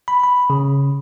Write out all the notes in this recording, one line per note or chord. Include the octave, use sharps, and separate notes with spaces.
B5
B5
C#3